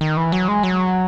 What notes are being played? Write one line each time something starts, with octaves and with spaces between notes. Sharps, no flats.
D#3
E3
F#3
G#3
F#3